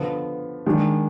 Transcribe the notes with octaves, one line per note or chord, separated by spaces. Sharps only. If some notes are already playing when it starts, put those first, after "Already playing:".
Already playing: D3 F3 B3 F4
D#3 G#3 D4